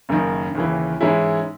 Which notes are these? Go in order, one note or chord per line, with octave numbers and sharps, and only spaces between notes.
F#1 F#2 D#3
D#2 C#3 E3
G#2 E3 G#3 C#4 E4